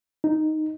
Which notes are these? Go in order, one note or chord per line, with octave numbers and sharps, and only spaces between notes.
D#4